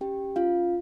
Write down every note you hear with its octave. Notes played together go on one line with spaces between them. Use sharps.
C#4 G4 G5
C#4 F4 F5